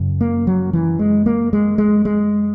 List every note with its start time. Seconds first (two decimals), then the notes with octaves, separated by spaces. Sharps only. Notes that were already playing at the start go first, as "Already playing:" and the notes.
Already playing: F#2 C#3
0.21 A#3
0.47 F#3
0.73 E3
0.99 G#3
1.26 A#3
1.53 G#3
1.78 G#3
2.05 G#3